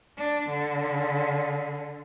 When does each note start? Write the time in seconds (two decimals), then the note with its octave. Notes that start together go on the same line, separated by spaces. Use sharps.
0.17 D4
0.49 D3